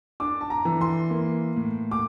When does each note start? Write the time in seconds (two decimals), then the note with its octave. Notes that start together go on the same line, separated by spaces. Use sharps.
0.20 D4 D6
0.41 A5
0.50 A#5
0.65 E3
0.81 C6
1.10 A#3
1.56 A2
1.91 D6